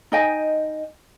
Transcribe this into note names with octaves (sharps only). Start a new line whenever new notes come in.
D#4 D#5 G5 G#5